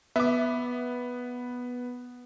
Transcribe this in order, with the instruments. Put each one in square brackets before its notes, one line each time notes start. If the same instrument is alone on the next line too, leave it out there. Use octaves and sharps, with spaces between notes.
[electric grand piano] B3 [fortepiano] E5 D6